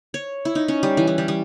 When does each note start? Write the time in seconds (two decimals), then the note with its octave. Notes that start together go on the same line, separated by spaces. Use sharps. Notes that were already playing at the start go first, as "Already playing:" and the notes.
0.14 C#5
0.45 E4
0.55 D#4
0.68 C#4
0.83 G3
0.97 E3
1.07 G3
1.18 G3
1.28 G3